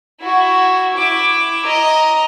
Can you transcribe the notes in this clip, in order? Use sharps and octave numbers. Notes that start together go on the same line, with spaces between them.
E4 F#4
E4 D6
D#5 A#5